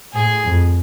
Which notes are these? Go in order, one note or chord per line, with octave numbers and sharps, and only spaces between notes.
A2 G#4
F2